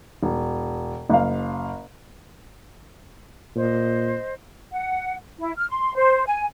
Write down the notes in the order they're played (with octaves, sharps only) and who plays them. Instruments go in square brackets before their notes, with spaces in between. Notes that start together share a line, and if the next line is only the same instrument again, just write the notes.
[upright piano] E1
F#1 F5
[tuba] A#2 [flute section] C5 D#5
[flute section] F#5
E4
F6
C6
C5
G#5